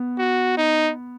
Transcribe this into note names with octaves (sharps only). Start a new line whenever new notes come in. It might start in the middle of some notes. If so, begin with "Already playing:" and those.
Already playing: B3
F#4
D#4